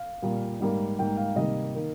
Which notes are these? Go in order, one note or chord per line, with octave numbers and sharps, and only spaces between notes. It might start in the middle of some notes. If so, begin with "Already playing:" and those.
Already playing: F5
A#2 G3 A#3
G#2 G3 A#3
G#2 G3 A#3 G5
F5
C3 D#3 G3 A#3 D#5
D#3 A#3